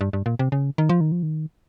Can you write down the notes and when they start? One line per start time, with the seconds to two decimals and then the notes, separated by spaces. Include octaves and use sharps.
0.01 G2
0.13 G2
0.26 A#2
0.39 C3
0.52 C#3
0.78 D#3
0.89 F3
1.01 D#3
1.12 F3
1.23 D#3